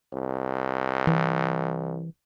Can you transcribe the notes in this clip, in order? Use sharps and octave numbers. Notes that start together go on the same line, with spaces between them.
C2
E3